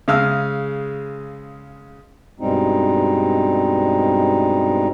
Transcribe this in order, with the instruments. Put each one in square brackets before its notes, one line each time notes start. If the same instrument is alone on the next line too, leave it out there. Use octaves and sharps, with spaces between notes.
[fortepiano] C#3 G#3 F5 E6 F6
[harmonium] G2 B2 G3 G#3 C4 D#4